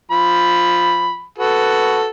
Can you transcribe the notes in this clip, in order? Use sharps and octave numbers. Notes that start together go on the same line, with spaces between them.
F3 B5
F#4 A4 B4